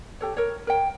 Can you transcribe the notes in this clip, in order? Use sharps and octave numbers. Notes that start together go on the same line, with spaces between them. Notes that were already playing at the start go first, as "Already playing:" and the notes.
G4 A4 C#5
A#4 C#5
A#4 C#5 G5